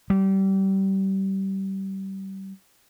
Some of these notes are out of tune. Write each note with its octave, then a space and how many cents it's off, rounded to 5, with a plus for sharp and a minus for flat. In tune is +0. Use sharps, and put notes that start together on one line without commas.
G3 -25